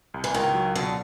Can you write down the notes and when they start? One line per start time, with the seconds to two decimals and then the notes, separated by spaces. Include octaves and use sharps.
0.14 C2
0.24 E3
0.34 C#2 D#3
0.55 F#3
0.75 B2 D3